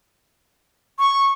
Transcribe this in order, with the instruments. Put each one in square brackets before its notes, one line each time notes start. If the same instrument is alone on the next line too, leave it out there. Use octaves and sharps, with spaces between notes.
[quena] C#6